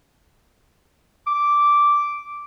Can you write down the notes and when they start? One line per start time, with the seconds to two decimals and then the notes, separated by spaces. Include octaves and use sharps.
1.27 D6